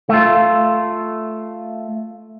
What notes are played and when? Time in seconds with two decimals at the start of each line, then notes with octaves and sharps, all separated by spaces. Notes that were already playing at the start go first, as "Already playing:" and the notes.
0.09 A3 F4